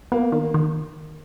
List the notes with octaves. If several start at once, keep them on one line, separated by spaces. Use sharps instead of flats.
A#3 B3
D#3
D#3